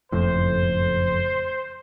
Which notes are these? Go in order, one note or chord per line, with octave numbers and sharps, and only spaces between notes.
F#1 F2 A2 C5